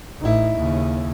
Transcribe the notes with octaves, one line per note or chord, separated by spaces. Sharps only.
A1 D#4 E4
D#2 C#3